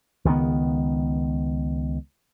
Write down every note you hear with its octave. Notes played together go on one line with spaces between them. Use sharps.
C#2 D#3 F#3 B3